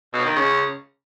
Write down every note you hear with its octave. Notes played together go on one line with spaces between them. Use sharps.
B2
D#3
C#3